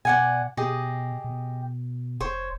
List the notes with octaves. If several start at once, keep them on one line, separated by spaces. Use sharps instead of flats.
B2 D5 F#5 G#5
B2 G4 G#4 D#5
B2
F1 C5 C#5